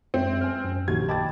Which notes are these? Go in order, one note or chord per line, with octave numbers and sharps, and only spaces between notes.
F#2 G#3 C4 E5
G#5 F6
F#2
A#1 D#2 F#4 G#6
D#5 G5 A5 B5 D6 A6